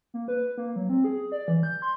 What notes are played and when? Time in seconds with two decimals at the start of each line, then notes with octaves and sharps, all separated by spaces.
0.14 A#3
0.28 B4
0.58 A#3
0.76 F#3
0.89 C4
1.04 G#4
1.32 D5
1.48 E3
1.63 G6
1.82 C6